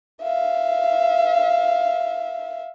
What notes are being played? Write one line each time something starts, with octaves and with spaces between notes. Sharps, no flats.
E5 F5